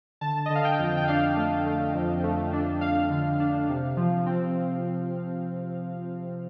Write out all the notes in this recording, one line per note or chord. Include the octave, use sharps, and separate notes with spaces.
D3 A5
D3 D#5
F5
G5
F2
G5
D4 F5
A3
A3
F2
A3
D4
F2 F5
D3
D4
C3
F3
C4